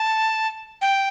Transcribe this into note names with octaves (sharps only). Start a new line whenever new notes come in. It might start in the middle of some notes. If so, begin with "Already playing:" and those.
Already playing: A5
G5